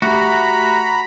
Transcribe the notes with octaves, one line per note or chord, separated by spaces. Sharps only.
A3 F#4 G4 A#5 B5